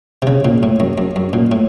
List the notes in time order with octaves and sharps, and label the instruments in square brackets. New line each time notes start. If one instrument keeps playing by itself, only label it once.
[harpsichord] C3
C#3
A#2
A2
F#2
F#2
F#2
A#2
A2